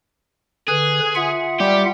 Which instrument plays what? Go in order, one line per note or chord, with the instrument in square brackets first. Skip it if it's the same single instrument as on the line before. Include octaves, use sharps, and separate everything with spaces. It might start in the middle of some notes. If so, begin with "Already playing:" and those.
[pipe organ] D3 B4 [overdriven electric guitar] G#4
[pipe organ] F4 E5 F#5
[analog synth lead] G3 [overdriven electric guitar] G4